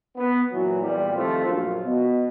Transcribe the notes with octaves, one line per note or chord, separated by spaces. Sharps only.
B3
A#2 E3 F#3
E2 A#2 G3
C3 D#3 F3 A3 F4 C5
A#1 F#2 F4
B2